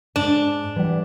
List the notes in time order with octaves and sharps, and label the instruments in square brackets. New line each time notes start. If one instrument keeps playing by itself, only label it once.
[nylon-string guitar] G#2 [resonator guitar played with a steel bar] D4
[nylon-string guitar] E3 G3 F#5